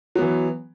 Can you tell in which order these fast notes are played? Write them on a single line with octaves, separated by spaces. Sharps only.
F#3 B3 E3